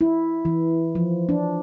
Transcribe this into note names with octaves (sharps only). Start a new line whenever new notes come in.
E4
E3
F3
D4